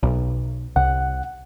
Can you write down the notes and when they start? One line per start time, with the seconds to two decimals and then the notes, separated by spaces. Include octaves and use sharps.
0.03 B1
0.76 C2 F#5